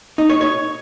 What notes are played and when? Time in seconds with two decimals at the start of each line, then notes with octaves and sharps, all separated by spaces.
0.18 D#4
0.30 C#5
0.41 C#5